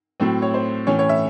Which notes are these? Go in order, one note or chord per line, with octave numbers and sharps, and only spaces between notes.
A2 F#3 A3 C4
C#5
C5
A2 E3 A3 C#4 C#5
C#5
E5